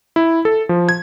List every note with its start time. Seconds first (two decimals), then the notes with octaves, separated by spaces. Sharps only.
0.16 E4
0.45 A4
0.69 F3
0.89 G#6